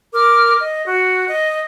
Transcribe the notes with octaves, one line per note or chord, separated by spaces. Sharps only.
A#4 D6 F6
D#5
F#4
D#5